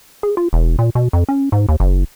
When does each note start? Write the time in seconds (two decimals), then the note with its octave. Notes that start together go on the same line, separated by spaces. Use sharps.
0.23 G#4
0.37 F4
0.53 E1
0.79 A#2
0.95 B2
1.13 F2
1.29 C#4
1.52 G#2
1.69 D#2
1.80 F#1